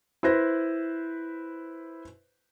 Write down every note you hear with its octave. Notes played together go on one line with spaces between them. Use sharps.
E4 B4 C5 A#6